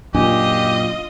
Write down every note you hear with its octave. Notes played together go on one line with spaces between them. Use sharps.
F#2 A#2 D4 F4 G4 D#5